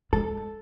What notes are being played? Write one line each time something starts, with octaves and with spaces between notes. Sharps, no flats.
G#3 A4